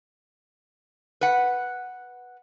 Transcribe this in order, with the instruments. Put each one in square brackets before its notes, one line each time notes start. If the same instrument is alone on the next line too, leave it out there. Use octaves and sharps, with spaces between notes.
[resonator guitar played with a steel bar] B4 F#5